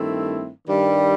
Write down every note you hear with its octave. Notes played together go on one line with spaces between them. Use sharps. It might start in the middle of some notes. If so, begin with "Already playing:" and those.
Already playing: G2 D#3 A3 C4 E4
G2 D#3 G3